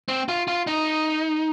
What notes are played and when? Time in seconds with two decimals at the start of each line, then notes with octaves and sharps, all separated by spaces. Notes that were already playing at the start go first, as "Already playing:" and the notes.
0.08 C4
0.28 F4
0.48 F4
0.67 D#4